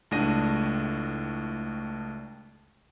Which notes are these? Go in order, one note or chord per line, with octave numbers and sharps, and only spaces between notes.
C#2 A2 A3 D4 A#6 D#7